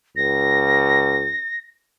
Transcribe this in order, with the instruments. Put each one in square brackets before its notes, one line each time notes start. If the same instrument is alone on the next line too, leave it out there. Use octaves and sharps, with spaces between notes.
[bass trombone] C#2 [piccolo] A#6